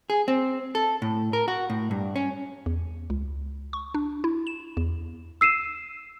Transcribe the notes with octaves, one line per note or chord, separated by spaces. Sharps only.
G#4
C4
A4
A2
A#4
F#4
A2
G2
C#4
E2
C#2
C#6
D4
E4
E7
E2
E6 C7 D#7 E7